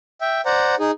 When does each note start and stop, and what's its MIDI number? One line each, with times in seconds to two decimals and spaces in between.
0.21 0.41 76
0.21 0.41 79
0.45 0.75 72
0.45 0.75 74
0.45 0.75 78
0.45 0.75 82
0.79 0.91 63
0.79 0.91 68